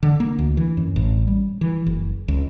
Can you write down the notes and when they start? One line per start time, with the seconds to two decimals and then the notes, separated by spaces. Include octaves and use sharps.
0.03 D3
0.20 A#3
0.38 D2
0.57 E3
0.77 F#2
0.96 A1
1.27 G3
1.61 E3
1.86 F#1
2.28 C#2